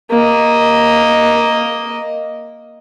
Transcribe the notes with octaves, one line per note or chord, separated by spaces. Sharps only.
A#3 D#5